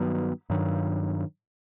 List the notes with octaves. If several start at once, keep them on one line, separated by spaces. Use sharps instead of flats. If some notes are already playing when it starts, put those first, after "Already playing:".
Already playing: G2 D#3 F#3 B3
G2 D#3 F#3